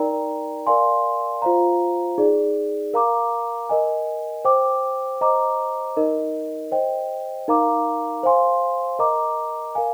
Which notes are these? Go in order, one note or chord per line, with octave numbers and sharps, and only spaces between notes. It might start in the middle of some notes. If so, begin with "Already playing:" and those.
Already playing: D#4 A#4 D5 G5 A#5
A#4 D5 F5 G#5 C6
F4 C5 F5 A#5
D#4 G#4 D5
A#4 F5 A#5 D6
A#4 D#5 G#5
C5 G5 D6
C5 D#5 A#5 D6
D#4 A#4 D#5
C5 D#5 G5
D#4 A#4 F5 A#5 D6
C5 F5 G#5 C6
A#4 D#5 A#5 D6
A#4 F5 G#5